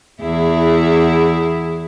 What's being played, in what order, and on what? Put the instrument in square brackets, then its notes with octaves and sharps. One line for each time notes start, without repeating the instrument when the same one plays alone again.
[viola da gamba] E2 E4 G#4